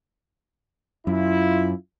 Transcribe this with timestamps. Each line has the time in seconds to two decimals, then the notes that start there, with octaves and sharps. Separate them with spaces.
1.07 F#2 E4 F4